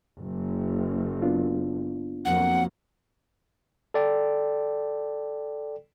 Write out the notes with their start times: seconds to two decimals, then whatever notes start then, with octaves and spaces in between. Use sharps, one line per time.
0.18 F#1
1.22 B3 D4 F4
2.25 F2 F#3 A#3 F#5
3.94 A4 D5 G5